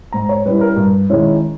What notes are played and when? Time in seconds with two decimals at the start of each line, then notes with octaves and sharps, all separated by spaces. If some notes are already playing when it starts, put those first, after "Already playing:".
0.12 G#2 A#5
0.29 C#5
0.46 G3 C#4 E4 B4
0.61 A#4
0.76 G2
1.09 D#3 G#3 C#4 E4